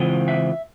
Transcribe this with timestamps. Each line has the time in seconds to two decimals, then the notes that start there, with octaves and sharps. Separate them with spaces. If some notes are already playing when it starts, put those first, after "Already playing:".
Already playing: C#3 E3 G#3 C4 F4
0.28 E5